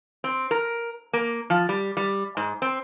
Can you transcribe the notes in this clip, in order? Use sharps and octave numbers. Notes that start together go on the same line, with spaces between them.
C4
A#4
A#3
F3
G3
G3
G#2
C4